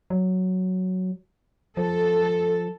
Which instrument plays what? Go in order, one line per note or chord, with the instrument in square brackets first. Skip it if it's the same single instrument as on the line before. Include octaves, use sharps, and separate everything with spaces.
[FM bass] F#3
[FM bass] F3 [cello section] A4